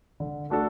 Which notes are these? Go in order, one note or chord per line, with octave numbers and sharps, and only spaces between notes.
D3
A3 D4 F#4 A4